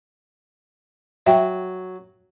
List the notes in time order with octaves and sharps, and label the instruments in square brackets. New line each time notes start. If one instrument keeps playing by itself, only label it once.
[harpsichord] F#3 [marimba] E5 G5